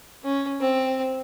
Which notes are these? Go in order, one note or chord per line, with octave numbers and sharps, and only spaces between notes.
C#4
C4